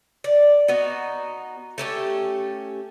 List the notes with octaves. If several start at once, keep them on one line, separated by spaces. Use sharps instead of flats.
D5
B3 D#4 F#4
A3 C#4 G4